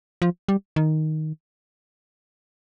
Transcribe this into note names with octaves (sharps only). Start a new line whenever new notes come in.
F3
G3
D#3